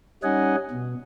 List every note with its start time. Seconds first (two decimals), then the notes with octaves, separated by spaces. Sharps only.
0.23 G3 C#4 D#4 D#5 F#5 G#5
0.71 B2